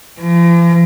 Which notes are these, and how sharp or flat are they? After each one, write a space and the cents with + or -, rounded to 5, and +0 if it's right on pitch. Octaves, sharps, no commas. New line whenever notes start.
F3 -45